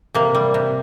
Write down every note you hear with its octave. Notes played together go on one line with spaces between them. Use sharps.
C3 A#3
G3
C3